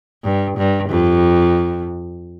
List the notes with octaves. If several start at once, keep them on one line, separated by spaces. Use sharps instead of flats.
G2
G2
F2